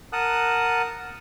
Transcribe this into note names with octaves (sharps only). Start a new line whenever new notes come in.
A#4 F#5 A5 D#6 F#6